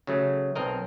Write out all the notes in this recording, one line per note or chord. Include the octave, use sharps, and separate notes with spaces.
C#3 F#3 A3
B1 C4 A#4 D#5